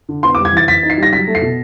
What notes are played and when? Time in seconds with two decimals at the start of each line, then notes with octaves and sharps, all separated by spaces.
0.09 D3
0.23 B3 C6
0.35 D6
0.38 G3
0.45 G#6
0.53 E3 A6
0.68 E3 B6
0.83 D#4
0.90 C7
0.98 G3 A#6
1.13 F#3 B6
1.28 A3
1.35 C7
1.42 B2